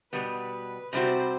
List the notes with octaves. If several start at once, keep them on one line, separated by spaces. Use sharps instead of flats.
B2 G3 B3 B4
C3 G3 C4 F#4 C5